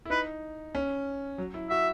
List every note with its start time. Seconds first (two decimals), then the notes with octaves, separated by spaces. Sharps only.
0.05 E4
0.10 D#4 B4
0.75 C#4
1.38 F#3
1.54 E4
1.70 F#4 E5